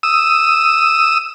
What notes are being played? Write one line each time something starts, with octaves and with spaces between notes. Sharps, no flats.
D#6 E6